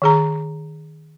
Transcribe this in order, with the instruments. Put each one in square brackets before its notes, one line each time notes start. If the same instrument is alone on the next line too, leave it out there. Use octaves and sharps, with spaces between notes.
[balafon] D#3 G#4 A#5